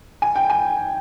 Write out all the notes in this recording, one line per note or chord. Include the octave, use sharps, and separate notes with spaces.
G#5
G5
G#5